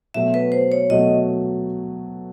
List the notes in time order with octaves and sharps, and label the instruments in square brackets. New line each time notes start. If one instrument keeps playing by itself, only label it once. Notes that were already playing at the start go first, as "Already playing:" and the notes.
[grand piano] B2 F#3 A3 [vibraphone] E5
[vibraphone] B4
C5
C#5
[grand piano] B2 F#3 A3 [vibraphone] D#5